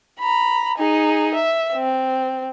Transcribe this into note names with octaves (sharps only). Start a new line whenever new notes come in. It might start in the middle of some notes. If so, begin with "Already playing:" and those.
A#5 B5
D#4 G#4
E5
C4